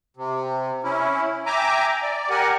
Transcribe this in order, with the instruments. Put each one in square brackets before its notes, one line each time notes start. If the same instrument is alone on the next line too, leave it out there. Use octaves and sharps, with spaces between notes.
[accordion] C3
C#4 E4
E5 G5 G#5 A#5 D6
D5
G4 A#4 F#5 G#5